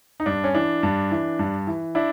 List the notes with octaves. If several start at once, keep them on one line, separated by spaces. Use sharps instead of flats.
D#4
G2 D4
C#4
E3 D4
G2
E3
G2
E3
D4 E4